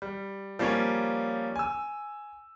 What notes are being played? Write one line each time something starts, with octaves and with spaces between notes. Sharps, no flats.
G3
F3 G3 A#3 C#4 C#5
G#5 E6